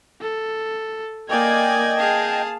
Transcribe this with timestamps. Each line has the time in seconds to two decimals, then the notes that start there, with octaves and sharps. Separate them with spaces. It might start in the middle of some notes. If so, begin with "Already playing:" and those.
0.21 A4
1.30 A#3 D5 D#5 G5 G#5 G#6
1.98 G#4 F5 A5